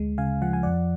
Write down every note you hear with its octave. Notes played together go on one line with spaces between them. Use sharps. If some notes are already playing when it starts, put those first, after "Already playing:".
Already playing: D2 G#3
C#3 F5 G#5
F3 F#5
G#5
F2 D5 F#5